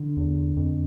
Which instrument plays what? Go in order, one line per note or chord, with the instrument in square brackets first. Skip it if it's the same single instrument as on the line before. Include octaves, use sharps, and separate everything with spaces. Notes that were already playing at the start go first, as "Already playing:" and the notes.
Already playing: [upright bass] D3
[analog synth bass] E2
F2